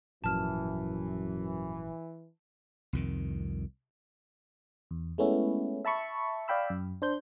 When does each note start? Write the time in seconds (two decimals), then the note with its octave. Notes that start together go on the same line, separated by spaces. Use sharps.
0.24 G#1 F#2 A#2 E3 F3 A5 F6
2.93 C2 F2 D#3
4.91 E2
5.18 G#3 A3 B3 C#4 E4
5.85 E5 A5 B5 C#6
6.48 D5 F5 G5 B5 E6
6.70 F#2
7.02 D4 C5 G6